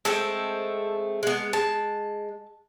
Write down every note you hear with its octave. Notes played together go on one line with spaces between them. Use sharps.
G#3 A3 C4 A4
G#3 B3
G#3 A5